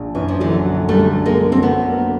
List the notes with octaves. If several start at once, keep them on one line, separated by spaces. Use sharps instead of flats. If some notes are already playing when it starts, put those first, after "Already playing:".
Already playing: A#1
F#2 E3
F3
D3 E3 F#3
D3
D3 G3 A3
D3
G#3 A#3
D3
C4
F#3 A3 B3
A#3